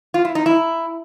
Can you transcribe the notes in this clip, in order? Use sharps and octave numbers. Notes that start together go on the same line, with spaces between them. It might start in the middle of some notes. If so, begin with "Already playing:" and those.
F4
E4
D#4
E4